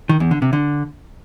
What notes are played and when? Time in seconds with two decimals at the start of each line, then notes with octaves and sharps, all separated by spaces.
0.09 D#3
0.20 E2
0.31 D3
0.42 C3
0.53 D3